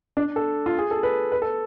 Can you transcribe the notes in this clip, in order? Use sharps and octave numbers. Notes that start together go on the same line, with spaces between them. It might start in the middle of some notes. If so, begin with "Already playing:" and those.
D4
A4
F4
G#4
A4
B4
B4
A4